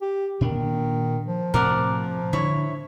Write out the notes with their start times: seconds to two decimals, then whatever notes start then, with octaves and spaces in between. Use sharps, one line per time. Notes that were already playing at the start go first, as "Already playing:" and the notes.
0.01 G4
0.41 A#2 D#3 D4
1.26 F3
1.54 A2 C3 A#4 D5 F#5
2.33 D3 E4 C#5